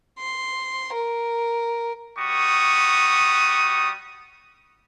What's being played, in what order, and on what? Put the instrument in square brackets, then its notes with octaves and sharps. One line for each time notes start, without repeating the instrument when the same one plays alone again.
[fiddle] C6
A#4
[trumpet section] G3 F#4 C#6 D#6